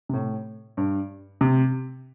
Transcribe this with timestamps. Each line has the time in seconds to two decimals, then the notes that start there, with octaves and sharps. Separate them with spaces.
0.09 C3
0.14 A2
0.77 G2
1.41 C3